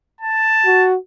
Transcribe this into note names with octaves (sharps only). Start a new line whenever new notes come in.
A5
F#4